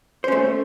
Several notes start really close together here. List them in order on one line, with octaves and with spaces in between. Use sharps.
C5 C#4 A3